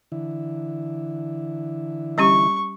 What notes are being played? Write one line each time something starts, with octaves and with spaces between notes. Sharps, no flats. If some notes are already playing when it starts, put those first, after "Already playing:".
D3 E3 E4
G3 C#4 G4 C#6